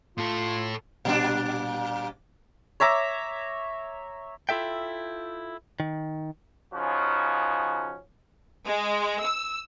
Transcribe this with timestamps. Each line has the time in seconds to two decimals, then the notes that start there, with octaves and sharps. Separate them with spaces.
0.18 A2 F4 A4
1.05 A#2 G3 D4
2.80 C#5 E5 A#5 D6
4.49 E4 F4 A4 E5 G5
5.80 D#3
6.74 C#3 F3 C#4 D#4 F#4
8.66 G#3
9.23 E6